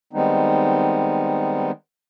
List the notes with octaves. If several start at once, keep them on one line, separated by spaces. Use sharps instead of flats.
D#3 G3 G#3 B3 C4 D#4